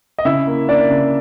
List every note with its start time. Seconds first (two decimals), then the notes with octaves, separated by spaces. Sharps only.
0.18 D#5
0.25 C#3 E4 E5
0.47 A#3
0.68 A#3 D4 D5
0.90 C#3